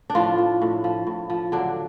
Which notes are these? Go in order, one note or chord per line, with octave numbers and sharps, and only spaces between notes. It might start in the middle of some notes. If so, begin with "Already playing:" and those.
D4
A2 F3 F4
F3
A2
F3
A2
F3
D3 F#3 D4